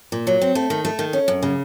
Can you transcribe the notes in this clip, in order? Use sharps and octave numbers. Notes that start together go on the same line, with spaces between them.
A#2
F#3
C4
A3
D#3
A3
D#3
C#4
F#2
C#3